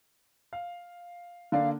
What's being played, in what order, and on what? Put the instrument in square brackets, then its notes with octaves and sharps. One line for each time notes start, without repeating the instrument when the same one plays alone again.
[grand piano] F5
[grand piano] D3 A#3 D5 [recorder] F5